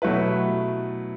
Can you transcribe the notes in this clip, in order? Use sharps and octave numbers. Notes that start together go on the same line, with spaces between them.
B2 F#3 A3 E4 B4